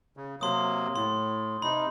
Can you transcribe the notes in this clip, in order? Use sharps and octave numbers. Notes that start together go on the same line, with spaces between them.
C#3
C3 F#3 A#3 C6 D#6
A2 C6
C3 D#4 B5